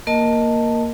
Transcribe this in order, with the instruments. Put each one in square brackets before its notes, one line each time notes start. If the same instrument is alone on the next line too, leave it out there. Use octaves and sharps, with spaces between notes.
[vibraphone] A#3 A#4 D#5 A5